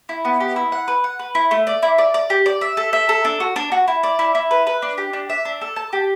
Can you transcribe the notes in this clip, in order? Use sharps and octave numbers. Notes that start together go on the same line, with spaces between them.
E4
B3
G4
E4
F#5
B4
F#5
B4
E4
A3
D5
E4
D5
D5
G4
D5
E5
A4
E5
A4
D4
F#4
D4
F#4
E4
D5
E4
E4
B4
B4
D4
G4
D4
E5
D4
A4
A5
G4